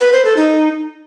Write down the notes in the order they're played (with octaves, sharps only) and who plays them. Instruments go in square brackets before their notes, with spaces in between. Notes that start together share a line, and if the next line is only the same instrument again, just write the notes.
[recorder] B4
C5
A4
D#4